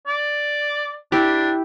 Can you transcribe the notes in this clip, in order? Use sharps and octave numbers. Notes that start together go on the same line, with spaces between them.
D5
D4 E4 G4